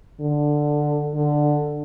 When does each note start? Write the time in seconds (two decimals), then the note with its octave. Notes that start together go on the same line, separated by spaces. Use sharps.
0.20 D3
1.14 D3